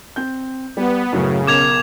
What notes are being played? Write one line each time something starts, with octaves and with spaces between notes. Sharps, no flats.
C4 G6
G3 B3
F#2 A2 C#3 F#3
B1 A#4 D6 G#6 E7 F7